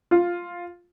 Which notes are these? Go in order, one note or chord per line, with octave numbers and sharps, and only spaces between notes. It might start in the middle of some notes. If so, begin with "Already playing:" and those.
F4